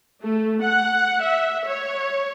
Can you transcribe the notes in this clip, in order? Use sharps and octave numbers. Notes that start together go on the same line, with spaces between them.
A3
F#5
E5
C#5